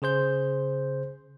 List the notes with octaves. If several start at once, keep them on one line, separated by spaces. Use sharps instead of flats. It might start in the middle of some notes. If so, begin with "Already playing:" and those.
C#3 G#4 C5 G6